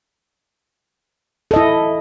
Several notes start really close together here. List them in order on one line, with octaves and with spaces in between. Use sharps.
A4 D#5 E4